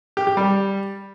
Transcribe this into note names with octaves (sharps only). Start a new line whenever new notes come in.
G4
G4
G3